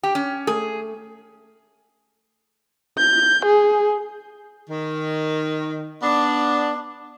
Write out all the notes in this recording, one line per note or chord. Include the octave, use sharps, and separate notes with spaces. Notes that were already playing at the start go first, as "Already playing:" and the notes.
G4 G5
C#4
A3 G#4
G6
G#4
D#3
B3 D4